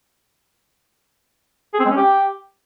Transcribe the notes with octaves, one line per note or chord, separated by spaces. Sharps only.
G#4
C4
G#3
C#4
G4